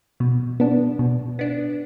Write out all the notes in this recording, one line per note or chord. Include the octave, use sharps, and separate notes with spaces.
B2
B3 D4
B2
B3 D4